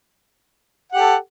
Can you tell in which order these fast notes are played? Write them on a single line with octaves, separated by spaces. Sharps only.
F#5 G4 A4